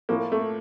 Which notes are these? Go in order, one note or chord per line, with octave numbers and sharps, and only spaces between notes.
A2 F3 A#3
A3